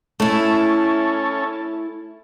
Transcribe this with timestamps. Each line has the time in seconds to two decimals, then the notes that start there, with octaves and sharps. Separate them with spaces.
0.20 A3 C#4 E4 A4